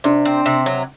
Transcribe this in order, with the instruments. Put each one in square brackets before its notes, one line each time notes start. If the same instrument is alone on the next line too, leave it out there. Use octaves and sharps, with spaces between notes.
[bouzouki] C3 [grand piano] D4
[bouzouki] C4
C3
F#3